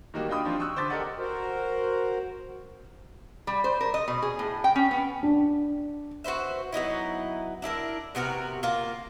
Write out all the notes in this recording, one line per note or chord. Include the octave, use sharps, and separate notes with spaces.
D#3 G3 A#3 D#4 F#4 G4
D4 F4 D#5 G5 B5 D#6
F3 C4 D4 F4 G4
C#6 D#6 E6 F#6
D3 C5 D6 A6 B6
G4 A4 A#4 D5 D#5 F#5
F#4 A#4 C5
G3
C5
A#4
D#5
B2
G#4
A2
G5
C#4
B3
D4
F#4 B4 C5 E5
F#3 B3 D#4 E4
D4 E4 G4 A#4
C3 B3 F#4 A#4
A#3 F4